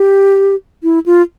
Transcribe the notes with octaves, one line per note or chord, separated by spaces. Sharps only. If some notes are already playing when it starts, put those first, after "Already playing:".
Already playing: G4
E4
F4